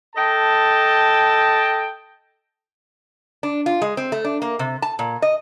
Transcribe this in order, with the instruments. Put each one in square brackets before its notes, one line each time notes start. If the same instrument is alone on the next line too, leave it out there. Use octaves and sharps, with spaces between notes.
[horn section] A4 D#5 G5 A5
[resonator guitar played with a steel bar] D4
F4
G#3
C4
A3
D4
A#3
C3
A5
A#2
D#5